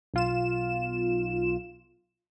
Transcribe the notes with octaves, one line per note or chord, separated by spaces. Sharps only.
B1 F4 E7